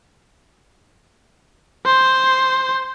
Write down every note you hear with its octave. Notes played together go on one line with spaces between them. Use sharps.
C5